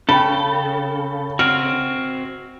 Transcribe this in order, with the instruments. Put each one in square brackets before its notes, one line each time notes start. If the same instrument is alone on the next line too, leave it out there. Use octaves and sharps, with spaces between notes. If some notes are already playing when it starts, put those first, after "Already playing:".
[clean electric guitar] C#3 [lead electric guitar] A4 [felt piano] G5 B5
[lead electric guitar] C4 F#4 [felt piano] F6